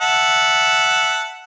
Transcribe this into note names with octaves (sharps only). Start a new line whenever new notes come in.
E5 F#5 A5